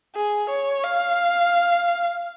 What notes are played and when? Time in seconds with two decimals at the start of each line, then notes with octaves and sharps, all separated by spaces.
0.15 G#4
0.50 C#5
0.84 F5